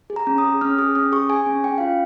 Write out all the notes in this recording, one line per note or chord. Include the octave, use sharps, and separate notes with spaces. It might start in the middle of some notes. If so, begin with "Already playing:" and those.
G#4
A#5
C#4
D#6
G#4
C#4 F6
G#4 D#6
C#4 D#6
G#4 C#6
G#4 G#5
C#4
C#4 G5
F4 F5